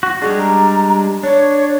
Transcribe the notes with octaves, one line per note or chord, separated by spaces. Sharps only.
F#4
G3 G#3 D4 G#4
A#5
D4 C#5